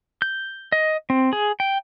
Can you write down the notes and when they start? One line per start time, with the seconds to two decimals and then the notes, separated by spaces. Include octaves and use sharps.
0.22 G6
0.72 D#5
1.10 C4
1.33 G#4
1.60 G5